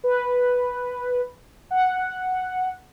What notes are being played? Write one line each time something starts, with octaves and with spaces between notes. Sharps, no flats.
B4
F#5